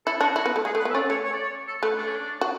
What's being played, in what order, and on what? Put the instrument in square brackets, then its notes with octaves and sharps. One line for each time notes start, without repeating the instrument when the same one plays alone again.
[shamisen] E4 [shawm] A4
[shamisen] D4 [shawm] F#4
[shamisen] E4 [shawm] F#4
[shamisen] B3
A3
[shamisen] G#3 [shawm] G#4
[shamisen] A3
[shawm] B4
[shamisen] B3
[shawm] E5
[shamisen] C#4 [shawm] D5
[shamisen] A3 [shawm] C#5
[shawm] C#5
D5
C#5
A4
[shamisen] A3 [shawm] B4
[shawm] D4
C#4
D4
[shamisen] F#4